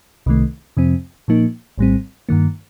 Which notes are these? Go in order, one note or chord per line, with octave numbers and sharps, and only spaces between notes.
C2 C3 D#3 A3
F2 C3 F3 C4
A#2 F3 A#3 D#4
A#1 A2 G3 C4
G2 D#3 A#3